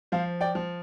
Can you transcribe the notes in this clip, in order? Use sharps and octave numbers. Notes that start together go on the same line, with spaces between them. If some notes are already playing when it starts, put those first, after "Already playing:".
F3 C5 F5
D5 G5
F3